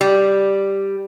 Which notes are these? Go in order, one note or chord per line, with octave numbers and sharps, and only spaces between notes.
G3